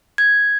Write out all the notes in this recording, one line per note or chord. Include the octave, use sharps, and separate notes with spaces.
G#6